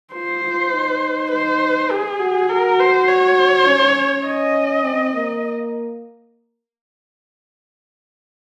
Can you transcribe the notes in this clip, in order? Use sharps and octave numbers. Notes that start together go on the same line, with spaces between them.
F4 C5
F4
D#4
C5
G#4
F#4
F#4 A#4
C5
C#5
C#4
D#5
C4
A#3